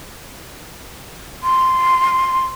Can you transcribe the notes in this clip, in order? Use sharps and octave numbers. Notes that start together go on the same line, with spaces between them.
C6